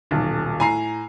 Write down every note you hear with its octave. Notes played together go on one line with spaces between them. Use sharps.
D#1 B1
A2 G#5 A#5 C7